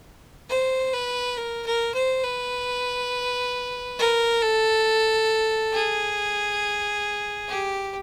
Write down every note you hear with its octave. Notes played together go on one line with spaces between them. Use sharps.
C5
B4
A#4
A#4
C5
B4
A#4
A4
G#4
G4